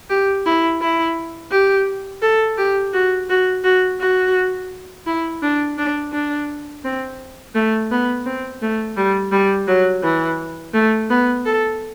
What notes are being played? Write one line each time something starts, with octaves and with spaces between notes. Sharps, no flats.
G4
E4
E4
G4
A4
G4
F#4
F#4
F#4
F#4
E4
D4
D4
D4
C4
A3
B3
C4
A3
G3
G3
F#3
E3
A3
B3
A4